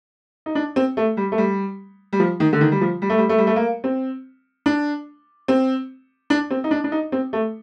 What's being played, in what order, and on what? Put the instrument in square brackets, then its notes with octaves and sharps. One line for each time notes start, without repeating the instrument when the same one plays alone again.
[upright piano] D#4
D4
C4
A3
G3
A3
G3
G3
F3
D#3
D3
D#3
G3
F3
G3
A3
G3
A3
G3
A3
A#3
C4
D4
C4
D4
C4
D#4
D4
D4
D#4
C4
A3